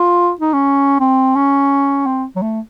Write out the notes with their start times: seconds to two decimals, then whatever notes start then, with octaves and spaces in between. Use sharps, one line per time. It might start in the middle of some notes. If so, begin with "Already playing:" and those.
Already playing: F4
0.40 D#4
0.53 C#4
1.00 C4
1.36 C#4
2.06 C4
2.36 F#3
2.42 A3